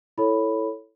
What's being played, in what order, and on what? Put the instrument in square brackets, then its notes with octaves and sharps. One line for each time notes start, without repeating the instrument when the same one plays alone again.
[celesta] E4 A4 C#5 B5